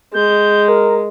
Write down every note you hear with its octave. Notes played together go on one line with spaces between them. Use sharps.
G#3 G6
A#4